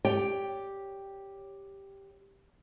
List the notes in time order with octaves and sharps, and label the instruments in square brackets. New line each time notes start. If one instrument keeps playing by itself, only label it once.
[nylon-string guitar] G4 C#5 D5 G5